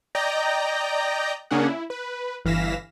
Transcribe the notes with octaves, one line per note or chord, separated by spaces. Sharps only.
D5 D#5 G5 A#5 G6 A#6
C#3 A#3 C#4 D4 G#4 F#5
E4
B4
G1 E3 F5 A#6 B6 E7